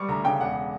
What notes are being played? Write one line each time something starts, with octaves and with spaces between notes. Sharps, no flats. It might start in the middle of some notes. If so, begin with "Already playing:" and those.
Already playing: G3 C#6
D2 A#5
C#3 G5
E1 F#5